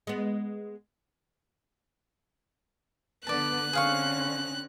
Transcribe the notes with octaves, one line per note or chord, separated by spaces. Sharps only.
G#3 B3
D3 B3 B4 D5 A5 F#6
D3 C4 C#4 G#4 F5 C#6